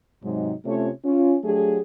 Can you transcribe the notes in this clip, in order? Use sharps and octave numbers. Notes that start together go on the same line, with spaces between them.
G#2 C3 F#3 G#3 D#4
C3 A3 C#4 F4 C#5
C#4 F4
F#3 A3 D4 G4 G#4